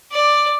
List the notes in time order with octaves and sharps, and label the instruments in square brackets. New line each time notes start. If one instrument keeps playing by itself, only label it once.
[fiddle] D5